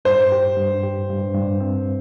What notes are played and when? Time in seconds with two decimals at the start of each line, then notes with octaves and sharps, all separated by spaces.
0.05 G2 C5
0.32 G4
0.57 G2
0.83 G4
1.10 G2
1.34 G2
1.60 C4